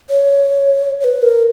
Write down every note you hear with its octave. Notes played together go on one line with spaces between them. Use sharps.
C#5
C#5
B4
A#4